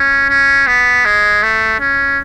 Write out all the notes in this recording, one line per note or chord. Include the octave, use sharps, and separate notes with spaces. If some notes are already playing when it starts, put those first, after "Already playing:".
Already playing: C#4
C#4
B3
G#3
A3
C#4